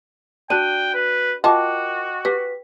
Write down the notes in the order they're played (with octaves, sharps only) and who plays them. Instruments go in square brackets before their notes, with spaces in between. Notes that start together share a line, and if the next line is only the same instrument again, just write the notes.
[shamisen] D4 [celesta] F#4 F#6 D#7 [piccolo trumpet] G5
[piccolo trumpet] B4
[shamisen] F4 A#4 A5 [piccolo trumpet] F#4 [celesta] D#5 G5 D6
[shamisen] G4 [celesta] B4 B6